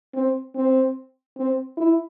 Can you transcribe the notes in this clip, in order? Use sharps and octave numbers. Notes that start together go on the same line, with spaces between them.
C4
C4
C4
E4